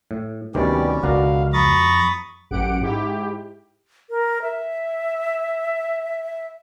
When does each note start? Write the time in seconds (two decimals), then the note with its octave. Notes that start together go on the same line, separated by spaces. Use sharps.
0.11 A2
0.55 D2 C3 D#3 G3 B3 C#4 G4 D5
1.03 C#2 B2 D3 F#4 A#4 D5 F5
1.53 F2 A#5 B5 C#6 D#6 A6
2.51 A1 F#2 G4 F#5 D7
2.81 G#2 E4 G4
4.10 A#4
4.42 E5